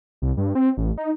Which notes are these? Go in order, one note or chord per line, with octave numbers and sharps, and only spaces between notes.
C2
G2
C4
A1
D#4